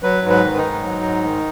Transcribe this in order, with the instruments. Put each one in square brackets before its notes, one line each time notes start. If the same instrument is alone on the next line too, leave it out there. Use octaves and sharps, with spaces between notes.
[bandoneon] F#3 B4
G#2
B4
D#3
D#4
G#2
F#3
G#2
D#3